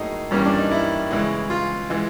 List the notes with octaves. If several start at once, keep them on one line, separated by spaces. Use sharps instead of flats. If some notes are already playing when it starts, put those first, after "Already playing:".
Already playing: A2 F#3 A#3 D#4 G#4
G2 E3 G3 A#3 C#4
D4
D#4
E4
C#3 E3 G#3
F4
E3 G#3